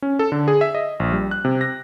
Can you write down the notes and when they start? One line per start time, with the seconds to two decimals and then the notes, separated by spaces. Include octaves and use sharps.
0.02 C#4
0.19 A4
0.32 D3
0.48 G#4
0.61 E5
0.75 D#5
1.00 A#1
1.12 G3
1.31 F#6
1.45 C3
1.61 A#6